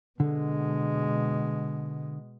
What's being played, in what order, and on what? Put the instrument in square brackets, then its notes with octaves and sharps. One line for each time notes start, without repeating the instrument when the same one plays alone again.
[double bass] B2 G#3 [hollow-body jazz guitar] D3